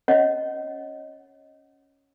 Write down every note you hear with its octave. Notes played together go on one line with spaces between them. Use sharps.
C#4 C#5 D#5 F#5